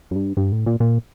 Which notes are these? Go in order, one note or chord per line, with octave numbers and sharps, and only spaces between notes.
F#2
G2
G2
A2
A#2
A#2